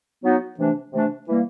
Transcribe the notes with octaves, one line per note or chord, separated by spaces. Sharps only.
F#3 B3 D#4 F#4
C3 E3 A3 D4
C3 E3 A3 D4
E3 G3 A#3